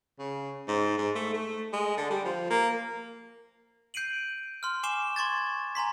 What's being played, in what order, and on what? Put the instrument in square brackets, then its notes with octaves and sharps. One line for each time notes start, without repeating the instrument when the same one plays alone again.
[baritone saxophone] C#3
G#2
G#2
A3
A3
G#3
D3
G3
F3
A#3
[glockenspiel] G6 C7 D7 D#7 F#7
C6 F6
G#5 C#6 D6 C7 E7 G7
C6 C#6 G#6 A6
G#5 A#5 C6 B6